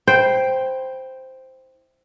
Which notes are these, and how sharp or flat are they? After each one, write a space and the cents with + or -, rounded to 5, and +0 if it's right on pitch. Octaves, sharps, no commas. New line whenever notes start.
E4 -15 C5 +0 G5 +0